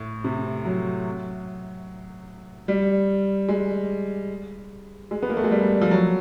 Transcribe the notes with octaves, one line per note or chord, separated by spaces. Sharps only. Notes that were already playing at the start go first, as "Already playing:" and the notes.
Already playing: A2
C3
F#3
G3
G#3
G#3
B3
A#3
A3
G#3
G3
F3
F#3